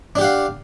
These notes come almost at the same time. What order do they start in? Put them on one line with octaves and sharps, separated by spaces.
D4 G4 F#5 F5